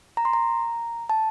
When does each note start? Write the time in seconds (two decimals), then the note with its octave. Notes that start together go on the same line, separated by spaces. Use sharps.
0.17 A#5
0.25 C6
0.33 A#5
1.09 A5